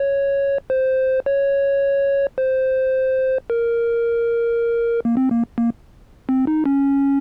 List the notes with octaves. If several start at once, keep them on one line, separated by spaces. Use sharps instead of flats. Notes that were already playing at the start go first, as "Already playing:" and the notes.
Already playing: C#5
C5
C#5
C5
A#4
A#3
C4
A#3
A#3
C4
D#4
C#4